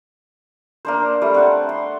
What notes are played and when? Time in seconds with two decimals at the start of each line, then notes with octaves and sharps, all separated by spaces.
0.85 A#3 D4 C5
1.22 G3 A3
1.34 C4 F#5 A5
1.69 C6